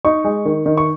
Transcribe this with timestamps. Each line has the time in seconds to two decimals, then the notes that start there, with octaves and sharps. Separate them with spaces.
0.05 D#4 C#6
0.24 G#3
0.45 D#3
0.66 D#3
0.77 C#6